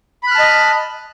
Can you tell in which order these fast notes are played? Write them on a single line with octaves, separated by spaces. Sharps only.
B5 F#6 F6 A5 D#5